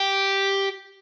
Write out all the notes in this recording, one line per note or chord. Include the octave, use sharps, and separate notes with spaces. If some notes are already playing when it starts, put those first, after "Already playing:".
Already playing: G4